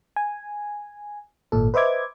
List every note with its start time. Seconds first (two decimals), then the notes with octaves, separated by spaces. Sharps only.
0.16 G#5
1.52 G#1 A#2 A4
1.74 B4 C5 D#5 E5 D6 G#6